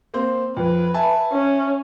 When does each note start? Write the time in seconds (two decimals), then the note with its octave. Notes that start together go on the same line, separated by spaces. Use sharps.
0.14 A#3 C4 C5
0.57 F2 B4
0.94 E5 G#5 A5
1.32 C#4